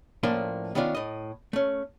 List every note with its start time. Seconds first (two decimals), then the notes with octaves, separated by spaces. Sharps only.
0.23 A2 F3 A#3 C#4 D4 C6
0.75 D#3 B3 C#4 D4 F4
0.95 A2 D#5
1.53 A3 C#4